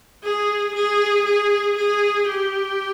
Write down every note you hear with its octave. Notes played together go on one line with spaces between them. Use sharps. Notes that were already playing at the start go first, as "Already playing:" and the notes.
G#4
G#4
G#4
G#4
G4